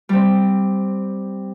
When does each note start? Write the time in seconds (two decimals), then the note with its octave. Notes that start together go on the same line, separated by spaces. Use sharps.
0.09 G3 C4